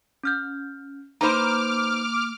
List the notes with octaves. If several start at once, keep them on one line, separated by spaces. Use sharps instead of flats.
C#4 F6 G6
A#3 D#4 B4 C5 A#5 B5 D6 F6